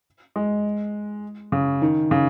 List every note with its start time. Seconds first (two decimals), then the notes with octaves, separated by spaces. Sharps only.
0.36 G#3
1.52 C#3
1.82 D#3
2.11 C#3